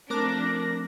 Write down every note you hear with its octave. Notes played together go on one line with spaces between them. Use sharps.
F3 A3 C4 D4 A#4 D6 F#6 A#6